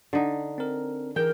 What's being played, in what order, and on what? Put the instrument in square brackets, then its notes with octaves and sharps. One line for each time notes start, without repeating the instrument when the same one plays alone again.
[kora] D3 D#4
[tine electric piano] C4 A#4
[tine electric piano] E3 G#4 G6 [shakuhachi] A#4 [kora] G5